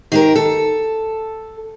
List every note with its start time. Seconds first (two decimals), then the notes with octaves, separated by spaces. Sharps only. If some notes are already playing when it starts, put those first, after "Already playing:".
0.12 D#3 G4 A#4
0.36 A4